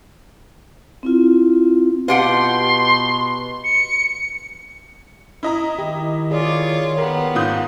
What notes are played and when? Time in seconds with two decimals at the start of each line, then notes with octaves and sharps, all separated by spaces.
1.03 C4 E4 F4
2.08 B2 F4 G4 F#5 C6
3.64 C#7
5.43 E4 D#5 A#5
5.79 D#3 G4
6.31 F4 G#4 C#5 D5
6.98 B3 G4 A#4
7.35 G#2 F4 D#6 G6